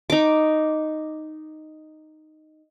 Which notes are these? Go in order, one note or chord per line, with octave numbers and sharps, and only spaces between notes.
D#4 D6